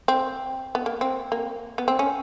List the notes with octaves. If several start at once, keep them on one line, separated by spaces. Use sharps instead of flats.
C4
B3
A#3
C4
A#3
B3
C4
C#4